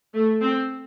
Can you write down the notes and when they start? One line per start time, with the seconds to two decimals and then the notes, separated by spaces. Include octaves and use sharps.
0.13 A3
0.41 C4